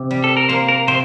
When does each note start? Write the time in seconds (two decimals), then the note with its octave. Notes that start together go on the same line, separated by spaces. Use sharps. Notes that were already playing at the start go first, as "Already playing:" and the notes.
Already playing: C3
0.11 G3
0.24 A4
0.37 A#4
0.49 A#3 C5
0.68 A#4
0.88 C3 C5